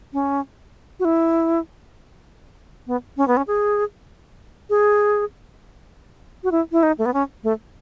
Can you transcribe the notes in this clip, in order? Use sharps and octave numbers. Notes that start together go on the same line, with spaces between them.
C#4
F#4
E4
B3
C#4
B3
C#4
G#4
G#4
F#4
E4
E4
D#4
A3
B3
C#4
A3